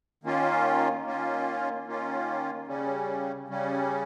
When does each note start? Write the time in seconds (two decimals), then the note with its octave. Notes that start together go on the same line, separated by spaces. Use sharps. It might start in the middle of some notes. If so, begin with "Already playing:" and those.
0.24 D#3 A#3 C#4 F4
1.05 D#3 A#3 C#4 F4
1.86 D#3 A#3 C#4 F4
2.67 C#3 G3 C#4
3.48 C#3 G3 C#4